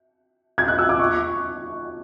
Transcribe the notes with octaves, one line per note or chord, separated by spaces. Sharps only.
G#6
F#6
E6
D6
C#6